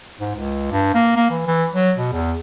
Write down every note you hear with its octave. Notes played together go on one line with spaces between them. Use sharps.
G#2
C#2
G2
A#3
A#3
E3
E3
F#3
B2
E2